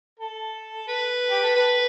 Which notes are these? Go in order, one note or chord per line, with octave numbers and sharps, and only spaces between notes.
A4
B4
G4
A4
B4